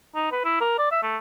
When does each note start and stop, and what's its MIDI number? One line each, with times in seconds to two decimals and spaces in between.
0.15 0.27 63
0.32 0.42 71
0.44 0.60 64
0.61 0.77 70
0.78 0.91 74
0.91 1.00 76
1.02 1.18 57